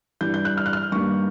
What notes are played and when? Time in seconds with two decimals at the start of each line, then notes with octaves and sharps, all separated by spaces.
0.21 G2 E3 G3 G6
0.34 G6
0.45 F#6
0.57 F6
0.66 F#6
0.73 F6
0.92 G2 D#3 G3 A#3 C#6